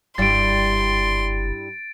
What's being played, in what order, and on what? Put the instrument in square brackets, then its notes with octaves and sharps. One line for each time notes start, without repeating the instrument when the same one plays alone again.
[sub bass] F#1 [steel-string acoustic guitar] G2 G3 E4 [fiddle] C6 [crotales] A6 D7